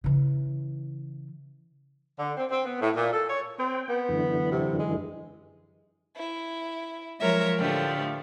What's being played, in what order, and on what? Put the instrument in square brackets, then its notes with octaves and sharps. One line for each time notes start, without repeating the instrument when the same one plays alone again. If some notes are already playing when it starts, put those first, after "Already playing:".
[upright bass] C#3 E3
[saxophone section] D3
C4
C4
B3
A2
A#2
A4
C#5
[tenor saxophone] C4 [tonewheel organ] G5
[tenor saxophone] B3
[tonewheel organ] F#2 D3 E3
[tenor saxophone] C3
G#3
[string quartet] E4
F3 F#3 G#3 A#4 C#5 E5
A2 D3 F3 A3 G4